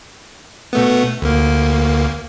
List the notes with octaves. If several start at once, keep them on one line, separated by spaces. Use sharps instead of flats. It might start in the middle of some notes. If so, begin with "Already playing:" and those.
B2 A3 B3
D2 A#3